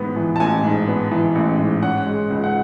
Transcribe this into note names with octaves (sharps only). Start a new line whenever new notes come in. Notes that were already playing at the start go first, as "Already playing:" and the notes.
Already playing: A1 G#2 E3 B3
E3
A5
A1 G#5
G#2
B3
E3
A1
G#2
C#4 F#5
G#3
C#2
F#5